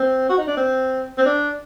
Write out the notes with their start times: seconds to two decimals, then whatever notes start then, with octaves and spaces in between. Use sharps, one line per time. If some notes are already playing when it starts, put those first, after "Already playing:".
Already playing: C4
0.29 F#4
0.38 D#4
0.47 D4
0.57 C4
1.18 C4
1.26 D4